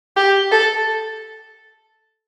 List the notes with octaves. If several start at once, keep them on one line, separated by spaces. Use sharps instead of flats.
G4
A4